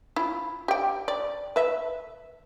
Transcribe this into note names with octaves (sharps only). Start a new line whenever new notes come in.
E4 F4
G4 G5
D5
B4 E5